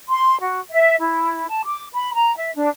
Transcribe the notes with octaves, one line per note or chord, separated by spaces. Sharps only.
C6
F#4
E5
E4
A5
D6
B5
A#5
E5
D4